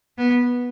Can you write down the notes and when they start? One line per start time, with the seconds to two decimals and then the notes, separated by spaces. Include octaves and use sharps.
0.18 B3